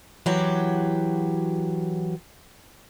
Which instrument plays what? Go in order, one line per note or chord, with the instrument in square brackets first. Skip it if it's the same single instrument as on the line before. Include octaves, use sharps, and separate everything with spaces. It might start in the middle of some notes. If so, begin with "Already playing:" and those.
[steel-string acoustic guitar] E3 F#3 F#4 G4